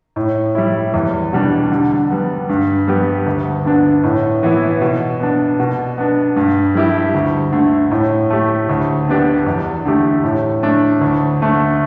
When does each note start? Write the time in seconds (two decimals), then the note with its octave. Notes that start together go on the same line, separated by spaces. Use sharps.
0.16 A2
0.55 G3 E4
0.94 E2
1.33 B2 G3 D4
1.71 D3
2.10 G3 B3
2.49 G2
2.87 G3 B3 G4
3.26 D2
3.65 D3 B3 D4
4.04 A2
4.43 E3 B3 E4
4.81 B2
5.20 B3 D4
5.59 B2
5.98 B3 D4
6.36 G2
6.75 G3 E4 G4
7.14 D2
7.52 D3 A3
7.91 A2
8.30 A3 G4
8.69 D2
9.08 D3 B3 D4 G4
9.46 E2
9.85 D3 A3 G4
10.24 A2
10.63 A3 D4
11.01 D2
11.41 D3 A3 D4